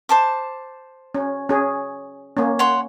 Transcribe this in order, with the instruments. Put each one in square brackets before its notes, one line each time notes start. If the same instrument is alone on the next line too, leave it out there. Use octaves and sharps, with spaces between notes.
[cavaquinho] C5 A5 D6
[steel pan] C#4
C#4 G#4
A#3 C#4
[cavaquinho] C#5 F#5 C6